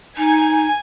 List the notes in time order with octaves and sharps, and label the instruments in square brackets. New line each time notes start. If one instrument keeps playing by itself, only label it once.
[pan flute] D#4 [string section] G#5